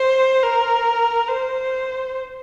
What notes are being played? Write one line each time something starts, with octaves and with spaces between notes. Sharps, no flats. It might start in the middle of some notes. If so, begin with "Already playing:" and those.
Already playing: C5
A#4
C5